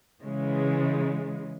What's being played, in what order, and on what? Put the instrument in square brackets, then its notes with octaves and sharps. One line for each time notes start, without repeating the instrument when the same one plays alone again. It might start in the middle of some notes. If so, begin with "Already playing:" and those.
[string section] C#3 E3 G#3